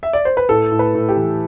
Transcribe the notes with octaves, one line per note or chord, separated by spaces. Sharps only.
E5
D5
C5
B4
A2 A4
A2
B4
A2
G4
E3